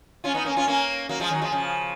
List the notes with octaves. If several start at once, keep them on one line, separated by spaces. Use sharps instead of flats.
C#4 F4
B3 D#4
A#3 C#4
C#4 F4
A#3 C#4
F#3 A#3
F3 G#3
D#3 F#3
F3 G#3
C#3 F3